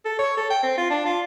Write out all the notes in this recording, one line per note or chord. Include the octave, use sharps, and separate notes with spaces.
A4
C#5
A4
G5
C4
F4
D4
F4